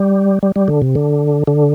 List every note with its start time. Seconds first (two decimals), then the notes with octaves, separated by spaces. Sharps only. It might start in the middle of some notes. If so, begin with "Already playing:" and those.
Already playing: G3
0.43 G3
0.56 G3
0.68 D3
0.82 C3
0.95 D3
1.47 D3